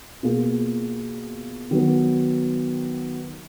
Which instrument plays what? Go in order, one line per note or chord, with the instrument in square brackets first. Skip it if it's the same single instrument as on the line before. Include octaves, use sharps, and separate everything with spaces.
[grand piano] B2 A#3 F4 G#4
D#3 F#3 B3